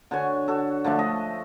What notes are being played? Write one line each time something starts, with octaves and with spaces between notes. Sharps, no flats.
D3 F#4 C#5 G#5
F#4 A4
D3 F3 A3 D4
D#5